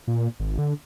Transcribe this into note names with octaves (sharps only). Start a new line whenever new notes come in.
A#2
G#1
D3